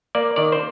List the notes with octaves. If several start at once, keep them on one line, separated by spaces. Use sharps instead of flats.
A#3 D5
D#3 D5
C5